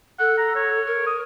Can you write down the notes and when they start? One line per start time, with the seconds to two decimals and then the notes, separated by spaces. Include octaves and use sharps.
0.19 A4 F#5
0.38 A#5
0.56 C#5
0.87 A#4
1.06 D#6